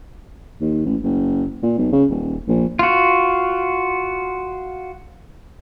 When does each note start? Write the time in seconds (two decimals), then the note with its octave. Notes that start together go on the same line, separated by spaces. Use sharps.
0.61 D#2
0.85 A1
1.03 F#1
1.63 A#2
1.78 B1
1.92 C#3
2.10 D#1
2.47 A#1
2.79 F4 F#4